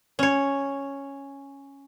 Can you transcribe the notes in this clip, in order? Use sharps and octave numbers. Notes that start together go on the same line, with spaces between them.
C#4 C#5